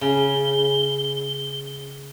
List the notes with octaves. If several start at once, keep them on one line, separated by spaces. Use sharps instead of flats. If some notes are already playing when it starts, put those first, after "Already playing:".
C#3 G7